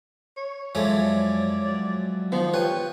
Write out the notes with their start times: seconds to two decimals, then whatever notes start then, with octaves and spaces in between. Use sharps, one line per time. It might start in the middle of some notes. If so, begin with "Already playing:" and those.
0.37 C#5
0.75 F#2 F3 G#3 A3 C#5 D5
1.69 F#3
2.32 D#3 F3 B3
2.54 F4 G4 B4 C#5 G5